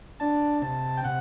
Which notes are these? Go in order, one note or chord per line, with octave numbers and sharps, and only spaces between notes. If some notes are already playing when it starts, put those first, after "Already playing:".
D4 A5
C3 A5
G5
C3 F#5